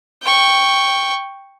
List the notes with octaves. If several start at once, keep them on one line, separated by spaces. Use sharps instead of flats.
G5 C#6